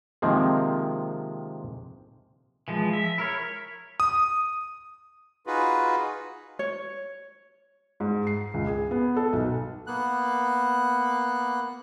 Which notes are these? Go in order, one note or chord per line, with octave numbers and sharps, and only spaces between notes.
C3 D#3 F3 G#3 A#3 C4
E3 F3 G#3
E5
E4 A#4 C#5
D#6
D#4 F4 F#4 G#4 B4
C#5
G#2
C7
C#2
G#4
B3
A4
B1
A#3 B3 F#6